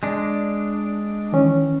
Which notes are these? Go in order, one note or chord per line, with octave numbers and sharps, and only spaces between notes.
G#3 D4
D#3 E3 C#4